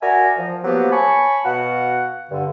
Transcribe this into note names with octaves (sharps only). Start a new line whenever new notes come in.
F#4 A#4 D5 E5 G#5 A#5
F3
F3 F#3 A#3 B3 G4 B4
C#5 G#5 A5 B5 C#6
B2 F#4 F5 F#5
G2 D3